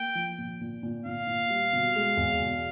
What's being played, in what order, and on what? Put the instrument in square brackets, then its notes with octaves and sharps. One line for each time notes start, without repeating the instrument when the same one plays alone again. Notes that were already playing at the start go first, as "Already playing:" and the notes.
Already playing: [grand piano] A#3 [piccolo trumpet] G5
[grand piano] F3
A#2
A#2
A#2
[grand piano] A#2 [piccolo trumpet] F5
[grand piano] A#2
G3
B2
G#3
E2
B2